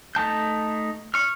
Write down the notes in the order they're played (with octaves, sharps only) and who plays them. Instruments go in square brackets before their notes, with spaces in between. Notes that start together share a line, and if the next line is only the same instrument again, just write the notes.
[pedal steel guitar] A3 D#4 A5 G6
C#6 F6